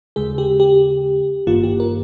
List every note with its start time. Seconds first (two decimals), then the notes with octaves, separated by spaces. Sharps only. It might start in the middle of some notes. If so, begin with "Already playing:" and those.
0.16 D#2 C#3 G#3 G#4
0.38 G4
0.60 G4
1.47 G#1 G2 D#3 A#3 F4
1.63 G4
1.80 A#4